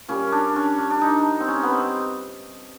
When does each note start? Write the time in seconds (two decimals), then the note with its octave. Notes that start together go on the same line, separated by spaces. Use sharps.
0.09 A#2 G3 C#4
0.32 D4
0.56 C#4
0.78 D4
0.91 D4
1.01 D#4
1.40 C4
1.48 C#4
1.63 B3
1.71 C4